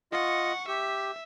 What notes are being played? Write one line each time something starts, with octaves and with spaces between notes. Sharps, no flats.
F4 D#5 F#5 C#6
G4 E5